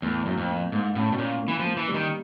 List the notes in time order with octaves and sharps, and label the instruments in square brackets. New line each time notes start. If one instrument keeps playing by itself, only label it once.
[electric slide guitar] E2 [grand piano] A2
[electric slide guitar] F#2 [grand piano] A#3
[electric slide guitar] F2
[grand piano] A#3
[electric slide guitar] G#2 [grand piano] A#3
[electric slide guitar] A2 [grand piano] C#4
[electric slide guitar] B2
[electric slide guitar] A#2 [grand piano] C#4
[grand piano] A#3
[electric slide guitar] E3
F3
[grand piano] A#3
[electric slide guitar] E3
[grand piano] G3
[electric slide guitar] D#3